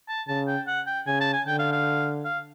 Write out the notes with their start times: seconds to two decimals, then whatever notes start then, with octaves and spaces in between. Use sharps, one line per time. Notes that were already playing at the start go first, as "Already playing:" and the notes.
0.08 A5
0.28 C#3 A5
0.47 G5
0.67 F#5
0.87 G5
1.07 C#3 G#5
1.20 A5
1.33 G#5
1.46 D3 G5
1.59 F5
1.72 F5
2.25 F5